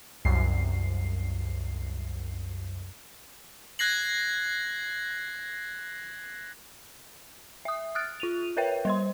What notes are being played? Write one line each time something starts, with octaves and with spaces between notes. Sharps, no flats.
C2 F#2 C7
F#6 G#6 A#6 C7 F#7
E5 D#6
D#6 F6 F#6 A6 D7
F4 D#7 F7
A#4 B4 C#5 E5 G5
G3 C5 C6